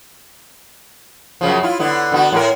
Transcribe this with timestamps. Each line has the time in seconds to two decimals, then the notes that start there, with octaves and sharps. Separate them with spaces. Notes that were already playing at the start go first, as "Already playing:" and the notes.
1.41 F#2 C#3 F3
1.63 E4 F4
1.80 D3 B3 E4
2.12 D3 B3 F#4
2.33 A2 G4 A#4